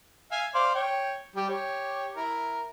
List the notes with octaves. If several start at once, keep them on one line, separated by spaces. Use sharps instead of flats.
E5 F5 G#5
C5 D5 F5
C#5 G5
G3 G4
G4 C#5
E4 A#4